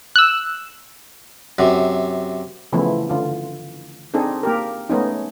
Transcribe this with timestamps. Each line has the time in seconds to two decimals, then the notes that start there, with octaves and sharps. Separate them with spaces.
0.16 E6 F#6
1.59 F#2 C3
2.72 C#3 E3 F3 A3 B3 E4
3.09 D3 F4
4.14 C4 D4 D#4 G#4 A4
4.43 A#3 G4 A#4
4.90 G#3 A3 B3 C#4 D#4